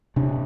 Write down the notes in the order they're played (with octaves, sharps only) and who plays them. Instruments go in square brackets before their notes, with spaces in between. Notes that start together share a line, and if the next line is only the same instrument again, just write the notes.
[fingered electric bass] C3 D4